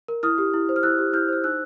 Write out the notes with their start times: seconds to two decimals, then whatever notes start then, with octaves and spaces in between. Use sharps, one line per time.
0.08 A#4
0.23 E4 D#6 F6
0.38 G4
0.54 E4
0.69 C5
0.76 F6
0.83 E4 E6 F#6
0.99 G4
1.13 E4 F6 G6
1.28 C5 F6
1.44 D#4 E6 F#6